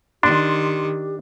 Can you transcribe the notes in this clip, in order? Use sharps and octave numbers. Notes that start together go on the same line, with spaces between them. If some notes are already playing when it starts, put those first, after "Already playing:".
D#3 D4 G4 C6